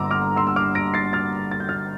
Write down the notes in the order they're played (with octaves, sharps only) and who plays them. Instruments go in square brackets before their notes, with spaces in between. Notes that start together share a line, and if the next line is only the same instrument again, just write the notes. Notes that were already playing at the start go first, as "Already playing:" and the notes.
Already playing: [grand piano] G1 G2 D3 A#5 C6 D6 E6
D6 F6
C6 E6
E6
D6 F6
A#6 D7
A6 C7
F6 A6
A6
G6
F6 A6